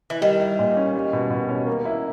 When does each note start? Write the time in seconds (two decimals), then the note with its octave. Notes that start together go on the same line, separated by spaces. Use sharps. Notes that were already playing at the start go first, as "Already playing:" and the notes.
0.10 E3
0.21 D#3 G3
0.40 E4
0.59 A#2
0.77 C#4
0.94 G3
1.13 B2
1.30 B2
1.49 C#4
1.67 A#3
1.85 E4